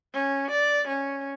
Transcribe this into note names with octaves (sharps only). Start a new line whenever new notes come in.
C#4
D5
C#4